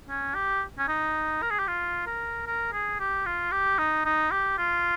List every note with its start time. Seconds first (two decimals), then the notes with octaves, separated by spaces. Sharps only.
0.09 C#4
0.35 G4
0.79 C#4
0.88 D#4
1.42 A#4
1.50 G#4
1.59 G4
1.67 F4
2.07 A#4
2.47 A#4
2.73 G#4
3.00 G4
3.26 F4
3.52 G4
3.78 D#4
4.05 D#4
4.31 G4
4.58 F4